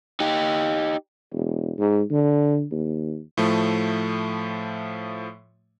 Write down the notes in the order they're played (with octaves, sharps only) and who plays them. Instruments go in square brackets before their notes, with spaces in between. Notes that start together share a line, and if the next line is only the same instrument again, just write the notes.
[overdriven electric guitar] D#4 G4
[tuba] E1
G#2
D3
D#2
[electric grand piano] A2 F3 A3